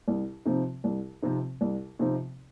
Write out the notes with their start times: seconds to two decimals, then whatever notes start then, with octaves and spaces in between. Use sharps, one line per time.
0.08 C2
0.45 C3 F3 C4 D#4
0.84 C2
1.22 C3 F3 C4 D#4
1.61 C2
1.99 C3 F3 C4 D#4